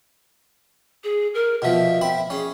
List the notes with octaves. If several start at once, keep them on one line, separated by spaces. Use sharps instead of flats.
G#4
A#4
B2 F3 E5
C4 B5
C#4 G#4